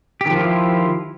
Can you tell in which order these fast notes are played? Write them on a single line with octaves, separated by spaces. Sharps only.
G4 D#3 F3 F4 E4